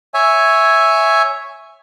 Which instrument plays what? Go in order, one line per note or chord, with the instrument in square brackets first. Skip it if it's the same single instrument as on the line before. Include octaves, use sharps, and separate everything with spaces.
[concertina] C#5 E5 G#5